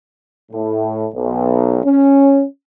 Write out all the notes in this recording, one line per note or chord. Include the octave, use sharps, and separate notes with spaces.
A2
B1
C#4